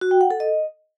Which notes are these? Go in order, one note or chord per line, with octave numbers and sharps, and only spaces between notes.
F#4
G5
F#5
A4
D#5